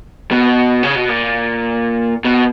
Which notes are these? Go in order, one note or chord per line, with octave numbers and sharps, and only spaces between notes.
B2
C#3
B2
A#2
B2